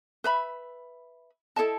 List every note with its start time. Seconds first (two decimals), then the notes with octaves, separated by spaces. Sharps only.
0.24 B4 E5 B5
1.56 E4 A4 D#5 A5